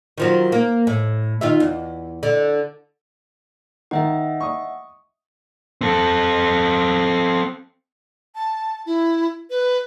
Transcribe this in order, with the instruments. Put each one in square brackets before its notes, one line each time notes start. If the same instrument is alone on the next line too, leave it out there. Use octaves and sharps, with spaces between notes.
[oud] D#3 F3 F#3
A#3
A2
D#3 F4 E5
E2
D3
[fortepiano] D#3 [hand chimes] D#5 E5 F#5
[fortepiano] C#6 D#6
[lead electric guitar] C4 A4
[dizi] A5
E4
B4